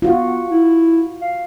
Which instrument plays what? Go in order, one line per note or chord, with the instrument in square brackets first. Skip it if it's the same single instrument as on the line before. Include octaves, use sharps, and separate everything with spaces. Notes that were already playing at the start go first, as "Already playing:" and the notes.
[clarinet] B3 [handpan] F4 F#4
[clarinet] E4
F5